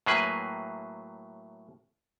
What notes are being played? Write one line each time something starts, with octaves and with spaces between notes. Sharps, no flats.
A2 F#3 A#3 G#4 B4 G#5